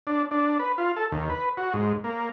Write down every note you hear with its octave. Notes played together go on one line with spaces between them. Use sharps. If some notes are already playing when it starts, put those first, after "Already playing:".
D4
D4
B4
F4
A4
D#2
B4
F#4
G#2
A#3